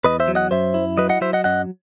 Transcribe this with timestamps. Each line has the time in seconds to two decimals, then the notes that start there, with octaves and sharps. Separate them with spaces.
0.04 E2 B4 D#5
0.20 C5 E5
0.28 F#3
0.35 D#5 F#5
0.51 F#2 C5 E5
0.74 E4
0.98 F#3 B4 D#5
1.09 D#5 F#5
1.21 F#3 C5 E5
1.33 D#5 F#5
1.44 F#2 D#5 F#5